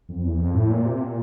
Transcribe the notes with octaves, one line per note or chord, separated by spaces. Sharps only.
F2
E2
F2
A2
A#2
C3
A#2